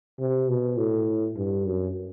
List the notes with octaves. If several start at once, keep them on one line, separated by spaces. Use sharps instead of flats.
C3
B2
A2
G2
F#2